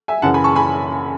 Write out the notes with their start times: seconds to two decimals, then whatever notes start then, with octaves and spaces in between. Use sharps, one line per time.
0.08 E5 G#5
0.22 F#2 C#3 E3 F#5 A5
0.34 G#5 B5
0.44 A5 C#6
0.56 G#5 B5